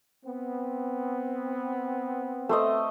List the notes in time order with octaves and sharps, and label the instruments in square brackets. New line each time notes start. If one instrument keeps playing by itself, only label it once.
[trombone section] B3 C4
[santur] A3 C5 D#5